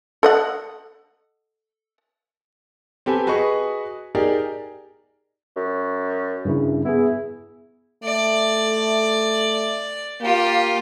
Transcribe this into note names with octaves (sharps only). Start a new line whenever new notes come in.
A4 D#5 F#5
C4 G4 A4 B4 G#5
F#4 G#4 B4 D#5 C#6
D#4 G4 G#4 A#4 D5
F#2
G2 C#3 E4
B3 E4 G#4
A3 D5
A#3 F4 G4